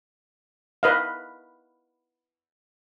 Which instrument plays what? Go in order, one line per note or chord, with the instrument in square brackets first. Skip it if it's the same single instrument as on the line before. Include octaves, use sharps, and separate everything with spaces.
[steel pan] B4 D#5 F5